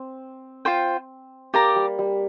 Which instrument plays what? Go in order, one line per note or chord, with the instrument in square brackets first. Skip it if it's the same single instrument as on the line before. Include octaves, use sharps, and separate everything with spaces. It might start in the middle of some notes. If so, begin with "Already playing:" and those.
Already playing: [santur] C4
[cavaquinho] F4 C5 G5
[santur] A#3 [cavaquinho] G4 D5 A#5
[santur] G3
G3